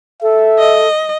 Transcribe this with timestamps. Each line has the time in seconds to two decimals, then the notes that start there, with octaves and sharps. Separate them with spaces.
0.22 A4 E5
0.59 D#5